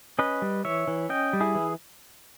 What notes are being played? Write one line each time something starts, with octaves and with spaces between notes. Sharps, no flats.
C#4 B4 D#5
G3
E3 C#5 E5
E3
C#4 D#5 G5
G3
E4 G#4
E3